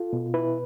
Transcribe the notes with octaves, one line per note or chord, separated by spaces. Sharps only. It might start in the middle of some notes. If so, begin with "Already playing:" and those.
Already playing: F4 A4
B2
E4 B4